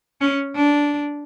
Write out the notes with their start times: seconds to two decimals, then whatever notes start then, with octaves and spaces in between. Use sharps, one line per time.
0.21 C#4
0.56 D4